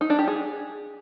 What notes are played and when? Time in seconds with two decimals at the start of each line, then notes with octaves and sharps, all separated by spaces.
0.01 D#4
0.10 D4
0.19 G4
0.28 G#4